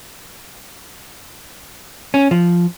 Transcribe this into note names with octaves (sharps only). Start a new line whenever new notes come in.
C#4
F3